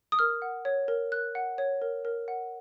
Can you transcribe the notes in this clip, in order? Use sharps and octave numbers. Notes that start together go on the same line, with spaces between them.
D#6
A#4 F6
F#5
C#5
A#4
A#4 F#6
F#5
C#5
A#4
A#4
F#5